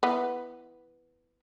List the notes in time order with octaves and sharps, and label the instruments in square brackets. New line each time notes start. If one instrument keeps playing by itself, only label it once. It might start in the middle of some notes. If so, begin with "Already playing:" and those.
[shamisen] E3 B3